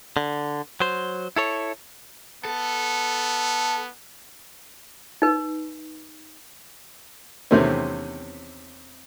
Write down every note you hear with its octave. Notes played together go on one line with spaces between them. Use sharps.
D3
F#3 C5
E4 A4 C#5
B3 A4
D#4 B4
E2 C3 D#3 A3 C4 C#4